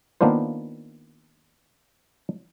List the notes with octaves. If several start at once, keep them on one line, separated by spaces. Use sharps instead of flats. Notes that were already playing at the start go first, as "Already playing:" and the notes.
D#3 A#3 B3 D4 F4 C5